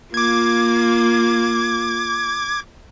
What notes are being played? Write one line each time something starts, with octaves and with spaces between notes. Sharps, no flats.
A#3 F4 D6 G#6